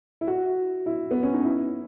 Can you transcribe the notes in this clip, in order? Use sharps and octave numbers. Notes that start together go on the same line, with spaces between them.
E4
F#4
E4
B3
C#4
D#4
E4